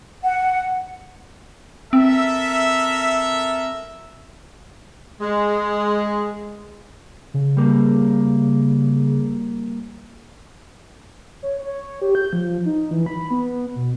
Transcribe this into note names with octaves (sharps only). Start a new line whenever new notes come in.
F#5
C4 A4 A#4 E5
G#3
C#3
G3 A#3
C#5
C#5
G4
G6
F3
D#4
E3
B5
B3
B2